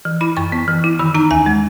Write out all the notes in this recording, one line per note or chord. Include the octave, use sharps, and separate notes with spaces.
E3
E4 B5
F#2 C#6
B3
E3
E4
D#3 B5
D#4 A#5
D#2 G#5
G#3